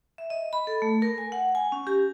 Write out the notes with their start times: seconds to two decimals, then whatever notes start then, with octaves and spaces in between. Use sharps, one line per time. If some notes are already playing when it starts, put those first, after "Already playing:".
0.18 E5
0.30 D#5
0.53 B5
0.67 A4
0.82 A3
1.02 A#4
1.18 G#5
1.32 F#5
1.55 G#5
1.72 C#4
1.87 G4